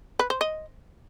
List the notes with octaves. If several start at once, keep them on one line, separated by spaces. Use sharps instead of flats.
B4
C5
D#5